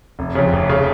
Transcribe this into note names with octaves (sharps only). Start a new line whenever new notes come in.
F1
F2 C#3
F1
C#3